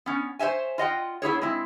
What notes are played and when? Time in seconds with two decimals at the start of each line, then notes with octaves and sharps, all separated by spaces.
0.06 B3 C#4
0.39 C5 C#5 E5 G#5
0.78 F4 D#5 F#5 G5
1.22 B3 E4 G#4 C#5
1.41 G#3 C4 E4